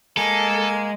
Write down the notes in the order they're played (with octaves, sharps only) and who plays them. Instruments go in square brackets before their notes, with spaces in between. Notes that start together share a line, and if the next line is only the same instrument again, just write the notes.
[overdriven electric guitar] G#3 [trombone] A#3 [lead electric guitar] A4 [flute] G#5